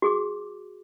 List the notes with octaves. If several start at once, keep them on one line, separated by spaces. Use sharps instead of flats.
F#4 G#4 D6